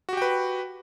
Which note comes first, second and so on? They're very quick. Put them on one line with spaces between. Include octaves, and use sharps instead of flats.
F#4 G4 G5 B4